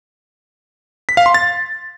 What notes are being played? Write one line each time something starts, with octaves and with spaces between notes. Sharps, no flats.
B6
F5
C6
A6